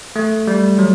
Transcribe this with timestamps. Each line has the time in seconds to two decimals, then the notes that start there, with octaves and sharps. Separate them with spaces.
0.16 A3
0.47 G3
0.79 F#3